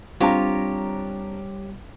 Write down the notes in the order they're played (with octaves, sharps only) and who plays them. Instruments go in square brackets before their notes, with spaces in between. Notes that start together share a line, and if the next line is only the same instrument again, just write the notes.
[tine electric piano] G3 [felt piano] C4 D4 A#5 [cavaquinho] F4 G4 C#5